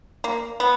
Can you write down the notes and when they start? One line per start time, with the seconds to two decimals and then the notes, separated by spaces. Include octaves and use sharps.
0.24 A#3
0.60 B3